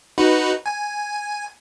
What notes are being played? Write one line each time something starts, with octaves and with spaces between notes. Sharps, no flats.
D#4 F#4 B4
G#5